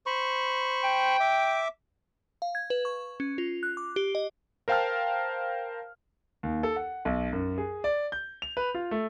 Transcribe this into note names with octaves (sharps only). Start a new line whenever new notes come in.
C5 B5 C#6
G5
E5 D6
F5
G#6
B4
C#6
C#4
F4
F#6
D6
G4
D#5
A#4 C5 F5 G5 A5 F6
D#2
A4
F#5
B1
F#2
G#4
D5
G6
F7
B4
F4
A3